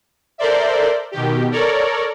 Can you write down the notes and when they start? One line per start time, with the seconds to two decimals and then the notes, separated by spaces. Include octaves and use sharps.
0.38 A4 A#4 C5 D5 E5
1.12 B2 D#3 G4
1.51 A4 A#4 C#5 D5